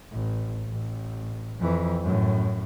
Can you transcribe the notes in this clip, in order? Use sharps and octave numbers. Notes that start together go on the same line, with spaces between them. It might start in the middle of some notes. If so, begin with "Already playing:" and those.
A1
A1
F2 E3
F#2 A2